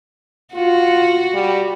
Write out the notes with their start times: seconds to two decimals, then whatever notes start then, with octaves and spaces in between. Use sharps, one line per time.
0.54 F4 F#4
1.34 G3